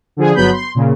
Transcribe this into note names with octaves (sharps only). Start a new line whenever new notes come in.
D3 F3 G#4
G1 F#3 B3 B5 G6
C6
A#2 C#3